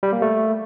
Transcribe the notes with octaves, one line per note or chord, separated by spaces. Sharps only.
G3
A#3
A3